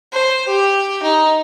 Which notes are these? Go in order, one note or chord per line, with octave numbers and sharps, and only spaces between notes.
C5
G4
D#4